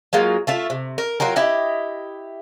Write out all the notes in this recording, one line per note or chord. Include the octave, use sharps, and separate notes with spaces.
F#3 G#3 A#3 F4
A3 F4 E5
C3
A#4
F#3 F4 G4 A#4
E4 G4 D#5